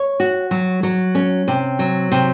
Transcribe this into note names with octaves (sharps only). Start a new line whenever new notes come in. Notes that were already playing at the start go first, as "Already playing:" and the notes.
Already playing: C#5
F#4
F#3
F#3
C#4
C3
F#3
C3